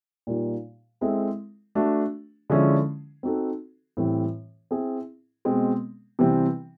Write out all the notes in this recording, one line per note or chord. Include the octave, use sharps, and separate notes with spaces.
A#2 G3 A#3 D#4
G#3 C4 E4 A4
A3 D4 F#4
D3 F3 G#3 C#4 E4
C4 D#4 F#4 A4
A2 E3 G3 C4
C4 E4 G#4
B2 G#3 C4
C3 E3 G3 C4